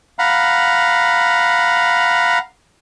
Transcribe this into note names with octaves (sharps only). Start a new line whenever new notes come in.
F5 F#5 A#5 B5